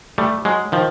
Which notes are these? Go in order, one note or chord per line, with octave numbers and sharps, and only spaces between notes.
G3 A3
F#3 G#3
D#3 F3